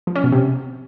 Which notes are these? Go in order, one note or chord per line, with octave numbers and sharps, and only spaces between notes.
F3
C#4
B2
C3